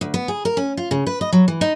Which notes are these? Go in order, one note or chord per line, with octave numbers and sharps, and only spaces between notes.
D2
B3
G#4
A#4
C#4
F4
C#3
B4
D#5
F#3
E3
D#4